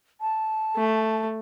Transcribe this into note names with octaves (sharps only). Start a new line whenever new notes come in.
A5
A3